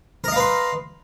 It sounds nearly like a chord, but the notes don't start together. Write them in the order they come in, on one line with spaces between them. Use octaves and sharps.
A#4 D#5 F5 B4 C6